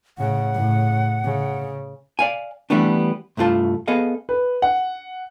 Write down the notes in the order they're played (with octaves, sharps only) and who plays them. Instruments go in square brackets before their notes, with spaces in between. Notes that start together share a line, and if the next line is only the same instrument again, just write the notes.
[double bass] A2 C#3 [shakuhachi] F#5
[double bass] A2 C#3
C#3
[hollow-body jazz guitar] D5 F5 G#5
E3 G3 A3 B3 D4
C2 G2 A3 F4 A5
B3 G#4 A4 D#5 F5
[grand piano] B4
F#5